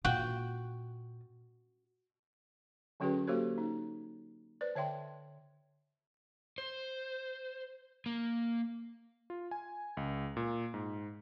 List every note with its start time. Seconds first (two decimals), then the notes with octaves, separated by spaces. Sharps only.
0.05 A#2 F4 F#4 G5
3.00 D3 F#3 C#4 F#4 G#4 B4
3.27 A#3 F#4 G4 A4 C5 C#5
3.58 D#4
4.61 B4 C5 D5
4.75 D3 C#5 E5 G5 C6
6.58 C5
8.06 A#3
9.30 F4
9.51 G#5
9.97 C#2
10.37 A#2
10.74 G#2